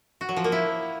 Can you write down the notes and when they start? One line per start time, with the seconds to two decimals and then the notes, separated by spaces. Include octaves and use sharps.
0.21 F#4
0.29 F#3
0.37 F3
0.44 A#3
0.52 E4